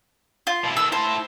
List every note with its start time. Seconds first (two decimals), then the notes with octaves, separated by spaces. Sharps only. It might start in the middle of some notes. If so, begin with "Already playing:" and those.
0.47 F4
0.64 B2 E4
0.77 D#3 A4 E6
0.92 E4 C5 A5